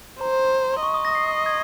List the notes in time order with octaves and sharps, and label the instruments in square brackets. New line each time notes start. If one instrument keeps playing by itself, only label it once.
[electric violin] C5 [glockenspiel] A#5
[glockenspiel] C6
[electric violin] D#5 [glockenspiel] C#6
[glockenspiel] D#6
A#6
C7
G#6